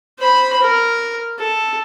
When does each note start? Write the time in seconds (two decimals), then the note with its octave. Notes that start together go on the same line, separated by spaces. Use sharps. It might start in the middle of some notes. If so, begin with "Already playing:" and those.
0.19 C5 B5
0.62 A#4
1.39 A4